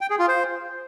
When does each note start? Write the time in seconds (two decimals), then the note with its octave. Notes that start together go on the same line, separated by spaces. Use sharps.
0.01 G5
0.10 G#4
0.19 F4
0.28 C5